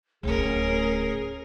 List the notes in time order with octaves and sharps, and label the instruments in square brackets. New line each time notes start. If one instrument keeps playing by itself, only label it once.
[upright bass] D1 D2 [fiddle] C#4 A#4 [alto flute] G#4